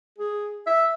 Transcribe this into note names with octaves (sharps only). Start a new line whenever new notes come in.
G#4
E5